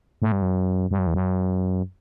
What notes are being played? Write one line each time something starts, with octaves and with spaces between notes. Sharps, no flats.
A2
G2
F#2
G2
F#2
E2
F#2